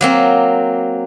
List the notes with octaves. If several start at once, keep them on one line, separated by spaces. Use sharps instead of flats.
F#3 A#3 C4